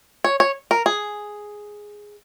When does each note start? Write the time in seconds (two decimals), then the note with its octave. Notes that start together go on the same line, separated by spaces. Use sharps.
0.24 C#5
0.40 C#5
0.71 A#4
0.86 G#4